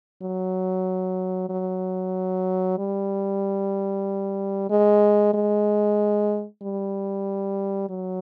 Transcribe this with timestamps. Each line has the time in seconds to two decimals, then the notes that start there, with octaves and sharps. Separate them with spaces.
0.22 F#3
1.50 F#3
2.78 G3
4.70 G#3
5.34 G#3
6.62 G3
7.90 F#3